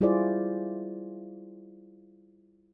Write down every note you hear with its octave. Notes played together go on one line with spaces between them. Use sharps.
G3 E4 F4 G#4 C5 D5